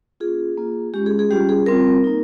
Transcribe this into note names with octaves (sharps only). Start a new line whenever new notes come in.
A#3 C#4 F4 G#4
A#3 F4
G#3 C#4 F4 G4
G#4
G#4
G3 C#4 F4 G4
G#4
G3 C4 F4 A#4
A#3 D#4